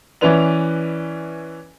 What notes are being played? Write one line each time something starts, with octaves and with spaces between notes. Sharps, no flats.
E3 C#4 E4 B4 D5 F7